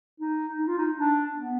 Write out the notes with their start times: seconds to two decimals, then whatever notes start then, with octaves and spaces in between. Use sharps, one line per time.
0.20 D#4
0.59 D#4
0.68 F4
0.78 D#4
0.97 D4
1.35 B3